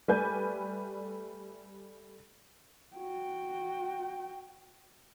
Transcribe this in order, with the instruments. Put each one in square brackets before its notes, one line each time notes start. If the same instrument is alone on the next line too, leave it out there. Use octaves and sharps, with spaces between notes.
[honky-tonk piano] G3 A3 B4 D5 G#5 G6
[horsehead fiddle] F#4 G5